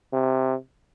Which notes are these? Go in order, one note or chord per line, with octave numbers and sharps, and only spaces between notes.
C3